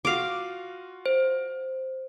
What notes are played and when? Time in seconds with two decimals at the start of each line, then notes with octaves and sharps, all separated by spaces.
0.05 F4 F#4 F5 D6
1.06 C5